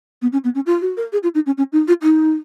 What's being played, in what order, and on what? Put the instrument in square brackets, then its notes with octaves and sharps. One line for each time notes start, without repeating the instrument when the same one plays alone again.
[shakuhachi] B3
C#4
B3
C#4
F4
F#4
A#4
G#4
F4
D#4
C#4
C#4
D#4
F4
D#4